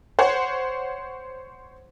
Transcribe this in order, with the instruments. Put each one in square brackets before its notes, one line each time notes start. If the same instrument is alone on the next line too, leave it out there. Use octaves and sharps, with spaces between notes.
[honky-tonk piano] C5 C#5 F#5